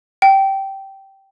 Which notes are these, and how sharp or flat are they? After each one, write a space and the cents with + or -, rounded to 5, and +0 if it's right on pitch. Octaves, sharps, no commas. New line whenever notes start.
G5 -15